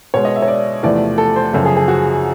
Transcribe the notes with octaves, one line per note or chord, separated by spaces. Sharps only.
B2 G#3 C#5
D#5
E5
C#5
D5
E2 C3 F3 A3 D5
A4
C5
F#2 C#3 F3 A4
G#4
G#4
F#4